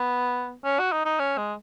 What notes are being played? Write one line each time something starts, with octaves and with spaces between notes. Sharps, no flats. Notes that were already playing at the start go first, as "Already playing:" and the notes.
Already playing: B3
C#4
F#4
D#4
D#4
C#4
G#3